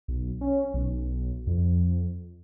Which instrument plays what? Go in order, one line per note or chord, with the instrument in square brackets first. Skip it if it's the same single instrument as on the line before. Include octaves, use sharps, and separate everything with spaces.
[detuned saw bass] B1
C#4
B1
F2